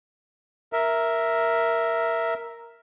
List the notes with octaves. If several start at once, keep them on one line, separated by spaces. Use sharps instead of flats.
A#4 E5